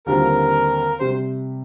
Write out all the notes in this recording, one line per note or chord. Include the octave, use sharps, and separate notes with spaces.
D#2 D3 G3 C4 F4 A#4
C3 G3 C5